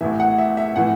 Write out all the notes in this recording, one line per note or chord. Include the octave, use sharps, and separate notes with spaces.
A1 A2 E3 E5
F#5
E5
E5
A2 E3 F#5